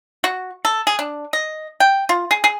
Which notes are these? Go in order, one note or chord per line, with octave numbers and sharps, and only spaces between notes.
F#4
A4
G#4
D4
D#5
G5
F4
G#4
G#4